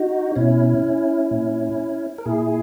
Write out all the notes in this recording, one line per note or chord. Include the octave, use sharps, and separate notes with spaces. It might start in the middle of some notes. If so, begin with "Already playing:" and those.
Already playing: D#4 F#4
B2 C#4 E4
A#2
A#4
A#2 E4 G#4